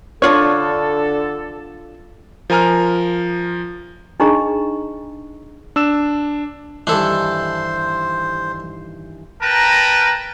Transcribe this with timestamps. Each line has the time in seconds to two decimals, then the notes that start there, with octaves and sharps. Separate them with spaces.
0.22 D3 D4 F4 A4 C#5
2.50 F3 A#4 G#5 A#5 F6
4.20 D4 D#4 G#4 D#5 A#5 C#6
5.76 D4 E6 E7
6.87 G2 D#3 E3 D4 A4 C5
9.42 A#4 B4 G5 A5 A#5